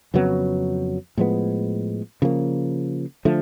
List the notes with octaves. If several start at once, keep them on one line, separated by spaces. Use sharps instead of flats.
F2 C#3 F#3 B3
A2 F3 G#3 B3
C#3 F3 A#3
D3 F3 A3